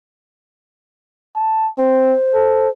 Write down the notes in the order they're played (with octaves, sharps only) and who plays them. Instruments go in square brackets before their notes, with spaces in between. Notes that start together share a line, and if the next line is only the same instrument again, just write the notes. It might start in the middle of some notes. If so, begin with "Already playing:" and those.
[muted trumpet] A5
[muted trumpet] C4 [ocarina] C5
[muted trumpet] A4